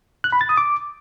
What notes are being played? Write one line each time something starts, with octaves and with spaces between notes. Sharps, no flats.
F#6
B5
A6
D#6
D6